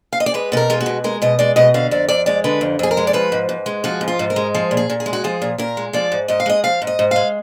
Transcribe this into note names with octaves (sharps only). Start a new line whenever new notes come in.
F5
D#5
D5
G#3 B4
B2 A#4 B4
G#3 F4
F#4
B2
G#3 A#4
B2 D#5
G#3 D5
B2 D#5
D3 F5
F2 D5
F2 D5
G#3 D5
D3 B4
F2
F2 G#4
A#4
G#3
D5
F3 B4
G#2
G#2
G#3
F3 F#4
G#2
F4
G#2
A#4
G#3
F3 G#4
A#2
G#4
A#2
G#4
G#3
F#4
F3 G#4
A#2
A#2 A#4
G#3
F3 D5
G#2
G#2 D#5
F5
G#3 D#5
F3 F5
G#2
D#5
G#2
G#3 F5